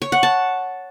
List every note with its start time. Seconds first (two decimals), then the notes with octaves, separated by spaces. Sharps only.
0.02 C#5
0.12 F#5
0.23 A5